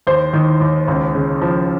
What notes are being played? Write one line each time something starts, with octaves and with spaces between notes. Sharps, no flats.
D#2 C5
D#3
D#2
C#2
C#3
F3